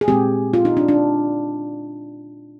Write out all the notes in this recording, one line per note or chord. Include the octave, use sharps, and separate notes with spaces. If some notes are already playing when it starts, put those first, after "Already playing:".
G#4
A#2 G#3 C4 G4
F4
D#4
D4
D4